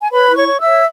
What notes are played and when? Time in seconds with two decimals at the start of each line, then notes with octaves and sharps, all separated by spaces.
0.01 G#5
0.10 B4 C#5 B5
0.29 E4
0.35 C#5 C#6
0.47 C#5
0.60 E5 E6
0.66 C#5